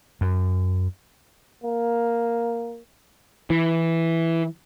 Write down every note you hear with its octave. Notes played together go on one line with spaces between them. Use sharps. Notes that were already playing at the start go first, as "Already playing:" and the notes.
F#2
A#3
E3